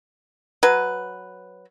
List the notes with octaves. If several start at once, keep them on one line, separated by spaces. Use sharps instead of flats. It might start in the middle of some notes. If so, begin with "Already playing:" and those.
F#3 B4